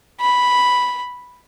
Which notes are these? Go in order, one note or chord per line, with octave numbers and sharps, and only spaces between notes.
B5